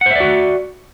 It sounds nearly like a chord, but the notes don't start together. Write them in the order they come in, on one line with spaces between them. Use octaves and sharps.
F#5 C5 E5 D5 F#4